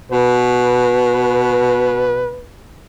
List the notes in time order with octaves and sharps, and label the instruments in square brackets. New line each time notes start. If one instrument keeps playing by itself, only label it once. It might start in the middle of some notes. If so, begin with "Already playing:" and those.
[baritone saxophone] B2 [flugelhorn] B4